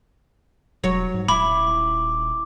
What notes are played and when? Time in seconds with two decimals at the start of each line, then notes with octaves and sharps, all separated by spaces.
0.84 E1 F#3 C#5
1.14 G#2
1.28 D#1 E4 B5 D6